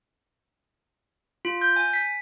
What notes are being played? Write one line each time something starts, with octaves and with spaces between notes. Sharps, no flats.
F4
G6
G#5
B6